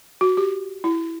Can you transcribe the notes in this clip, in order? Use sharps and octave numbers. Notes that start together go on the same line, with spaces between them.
F#4
G4
E4